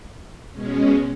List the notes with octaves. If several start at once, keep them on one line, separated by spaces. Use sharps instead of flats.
B2 G#3 C#4